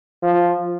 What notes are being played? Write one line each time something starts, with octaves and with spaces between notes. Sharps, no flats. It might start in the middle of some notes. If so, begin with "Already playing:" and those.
F3